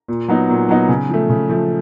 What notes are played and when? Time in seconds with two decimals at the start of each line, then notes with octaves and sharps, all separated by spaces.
0.08 A#2
0.28 F#3 B3 D#4
0.49 A#2
0.69 F#3 B3 D#4
0.89 C#3
1.09 F3 A3
1.29 C#3
1.49 F3 A3